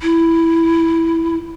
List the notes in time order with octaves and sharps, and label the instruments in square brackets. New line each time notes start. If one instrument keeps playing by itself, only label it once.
[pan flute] E4